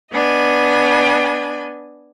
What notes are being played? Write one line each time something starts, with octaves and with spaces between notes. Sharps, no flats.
B3 D4 D#5 G#5